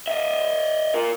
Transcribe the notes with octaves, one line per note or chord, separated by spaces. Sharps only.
D#5 E5
F4 A#4